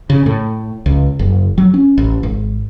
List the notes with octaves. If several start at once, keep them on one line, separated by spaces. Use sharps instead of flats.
C#3
A2
C#2
F#1
F#3
C#4
A1
G#1